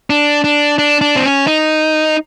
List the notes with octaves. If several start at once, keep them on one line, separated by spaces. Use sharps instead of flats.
D4
D4
D4
D4
C4
C#4
D#4